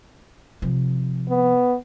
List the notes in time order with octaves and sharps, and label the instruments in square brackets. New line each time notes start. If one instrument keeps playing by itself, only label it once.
[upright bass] C3 F3
[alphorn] B3